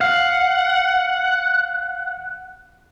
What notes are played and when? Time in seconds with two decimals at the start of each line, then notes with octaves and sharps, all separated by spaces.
0.01 F5 F#5